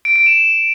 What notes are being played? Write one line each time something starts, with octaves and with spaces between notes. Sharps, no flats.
D7
D7
E7